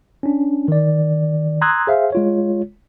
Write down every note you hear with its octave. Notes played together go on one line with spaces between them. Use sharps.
C#4 D4
D#3 D5
A#5 C6 D#6 E6 F#6 G#6
G#4 C5 E5 F5
G#3 F4 C#5